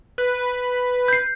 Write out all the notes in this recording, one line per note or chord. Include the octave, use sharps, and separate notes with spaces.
B4
G6 C7